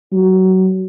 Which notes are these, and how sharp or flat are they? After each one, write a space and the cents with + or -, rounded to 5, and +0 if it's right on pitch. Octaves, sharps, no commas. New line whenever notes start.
F#3 +20